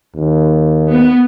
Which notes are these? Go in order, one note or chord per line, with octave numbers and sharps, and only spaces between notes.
D#2
B3